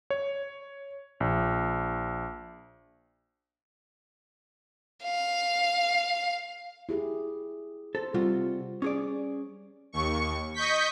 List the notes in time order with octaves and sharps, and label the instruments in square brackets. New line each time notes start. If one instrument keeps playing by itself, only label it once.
[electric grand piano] C#5
A#1
[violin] F5
[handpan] E4 G4 G#4
[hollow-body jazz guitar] A4 [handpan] C5
[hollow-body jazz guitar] C3 F4 F#4 [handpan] G3
[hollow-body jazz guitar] C#4 G#4 D5
[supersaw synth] D#2 C#6
D#5 C#6 G6 B6